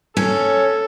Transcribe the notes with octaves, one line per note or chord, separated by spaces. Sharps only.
C#4 A4